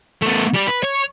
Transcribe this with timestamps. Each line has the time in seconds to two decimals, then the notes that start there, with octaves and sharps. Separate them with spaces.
0.22 A3 B3
0.54 G3 G4
0.68 B4
0.83 C#5